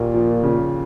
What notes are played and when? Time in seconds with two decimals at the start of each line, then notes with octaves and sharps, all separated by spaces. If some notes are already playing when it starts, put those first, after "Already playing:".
Already playing: D#2 A#2 A#3
0.14 F3
0.43 C#3